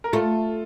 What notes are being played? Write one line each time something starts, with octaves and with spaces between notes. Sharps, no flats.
A#4
A3 F4 A4